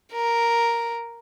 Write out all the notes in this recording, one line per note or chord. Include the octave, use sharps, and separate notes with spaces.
A#4